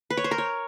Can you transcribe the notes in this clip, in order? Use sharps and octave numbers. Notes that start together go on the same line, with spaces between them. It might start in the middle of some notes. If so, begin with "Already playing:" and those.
B4
C#5
C5
A#4
C#5